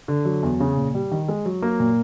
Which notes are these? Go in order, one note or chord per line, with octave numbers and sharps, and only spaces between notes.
D3
F#3
E2
C#3
A#2
G3
D#3
G#3
F#3
A#3
A#2